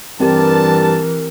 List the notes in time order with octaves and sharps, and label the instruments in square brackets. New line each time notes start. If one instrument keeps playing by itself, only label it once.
[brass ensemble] G2 A5 [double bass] E3 [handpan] C4 G4 [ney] A#4